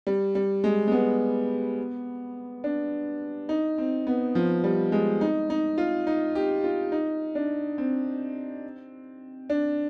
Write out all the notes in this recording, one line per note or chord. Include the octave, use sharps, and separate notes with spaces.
G3
G3
G#3
G#3
B3
D4
D#4
C4
B3
F3
G3
G#3
D#4
D#4
F4
D#4
G4
F4
D#4
D4
C4
D4